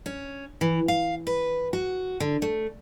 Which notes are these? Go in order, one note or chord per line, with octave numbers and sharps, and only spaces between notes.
C#4
E3
F5
B4
F#4
D3
A3